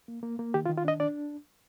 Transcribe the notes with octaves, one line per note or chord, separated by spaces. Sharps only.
A#3
A#3
A#3
D#3 G4
F4
D#3
F4
D4 D#5
D4 D5